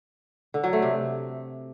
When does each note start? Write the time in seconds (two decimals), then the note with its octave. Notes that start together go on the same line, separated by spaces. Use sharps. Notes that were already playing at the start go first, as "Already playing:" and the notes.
0.54 D3
0.64 F#3
0.73 A3
0.82 C3